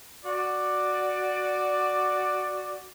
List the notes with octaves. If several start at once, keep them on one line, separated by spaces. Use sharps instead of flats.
F#4 D5